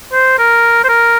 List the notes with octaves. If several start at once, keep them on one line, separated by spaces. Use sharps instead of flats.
C5
A#4
C5
A#4